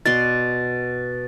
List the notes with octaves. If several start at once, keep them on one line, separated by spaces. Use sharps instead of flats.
B2 D5 C6 A6